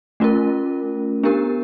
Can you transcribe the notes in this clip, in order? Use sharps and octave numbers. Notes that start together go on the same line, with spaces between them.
A3 C#4 F4 A#4
B3 D4 G4 A#4